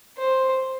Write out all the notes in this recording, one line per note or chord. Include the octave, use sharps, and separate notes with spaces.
C5